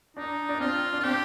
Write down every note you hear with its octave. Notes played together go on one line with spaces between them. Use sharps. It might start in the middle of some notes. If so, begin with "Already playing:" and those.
D4 D#4
D4
C4 F4
D4
F4
C4 G4